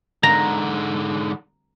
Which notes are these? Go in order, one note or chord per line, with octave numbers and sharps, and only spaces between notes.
G#2 D3 A#5